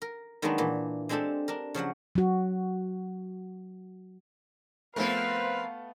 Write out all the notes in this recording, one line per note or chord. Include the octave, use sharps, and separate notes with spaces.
A#4
D#3 F#3 G#3 A#3 B3 D4
A#2 E3
G#3 C4 D4 G4 A4
D4 A#4
C#3 F3 F#3 F#5
F#3 F#4
F3 A3 B3 C4 A#4 B4 F5